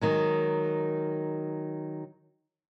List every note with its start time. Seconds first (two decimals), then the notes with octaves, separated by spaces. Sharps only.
0.01 D#3 F#3 G#3